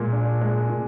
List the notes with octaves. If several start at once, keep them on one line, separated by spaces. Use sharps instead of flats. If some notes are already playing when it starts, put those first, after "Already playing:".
Already playing: A#2 G#3
D4
G#3
A#2